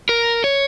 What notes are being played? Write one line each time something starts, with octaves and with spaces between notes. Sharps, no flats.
A#4
C#5